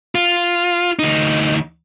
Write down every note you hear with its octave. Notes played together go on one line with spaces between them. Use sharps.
F4
D2 D#4